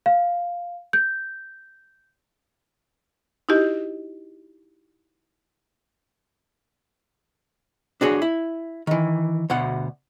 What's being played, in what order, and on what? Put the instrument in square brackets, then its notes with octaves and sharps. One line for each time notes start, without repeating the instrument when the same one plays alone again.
[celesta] F5
G6
[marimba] D#4 E4 F#4 G4 D#5
[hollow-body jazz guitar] D4 F#4 G#4 C#5
E4
D#3 E3
D2 B2 F#5